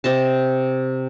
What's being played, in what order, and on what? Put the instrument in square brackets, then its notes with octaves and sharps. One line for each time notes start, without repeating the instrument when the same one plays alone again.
[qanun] C3 D#5 A5